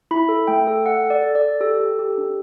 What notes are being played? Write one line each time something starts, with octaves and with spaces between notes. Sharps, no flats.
E4 B5
A4
A3 G5
A4
A4 F#5
A4
D5
A4
D5
A4
G4 A4
G4
G4
D4